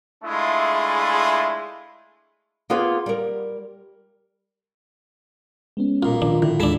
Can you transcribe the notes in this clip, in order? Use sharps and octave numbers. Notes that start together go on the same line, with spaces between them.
G#3 A3 D4 E4 F4 G#4
A#3 B3 F4 G#4 B4
G3 A#4
G#3 B3 C#4
B1 A#2 F4
D#3 F3 D4 F4
A2 D3 E4
D#2 A2 G#3 D4 E4 A5